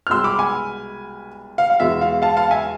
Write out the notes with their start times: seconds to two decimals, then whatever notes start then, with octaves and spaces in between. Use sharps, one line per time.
0.07 F6
0.10 C2 B2 G#3 C6 E6
0.24 B5 D6
0.39 G#5 B5
1.58 F5
1.70 F5
1.80 E2 B2 G#3 E5
2.01 F5
2.22 F5 A5
2.37 F5 A5
2.51 E5 G#5